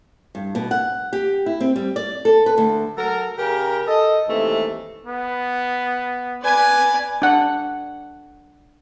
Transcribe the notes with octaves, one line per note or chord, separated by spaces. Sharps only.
G2
B2
F#5
G4
E4
C4
G3
D5
A4
B4
D2
F#3 A4 A#4
C#3 G4 A#4
A4 D#5
D#2 C3 E3 G#3 A3
B3
B4 D5 G#5
D4 F#5